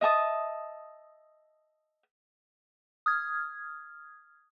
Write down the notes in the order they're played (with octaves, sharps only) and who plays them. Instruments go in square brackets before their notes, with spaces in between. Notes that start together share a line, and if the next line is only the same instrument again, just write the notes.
[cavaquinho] D#5 E5 A5 D#6
[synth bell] D#6 F6 G#6